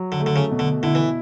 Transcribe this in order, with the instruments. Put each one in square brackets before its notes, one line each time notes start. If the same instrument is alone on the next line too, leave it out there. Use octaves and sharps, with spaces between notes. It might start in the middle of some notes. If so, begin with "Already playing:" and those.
Already playing: [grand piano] F#3
[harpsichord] D3
[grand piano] A3
[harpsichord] D3
C#3
[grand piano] B2
[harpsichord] D3
[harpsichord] D3 [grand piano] E4
[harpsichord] E3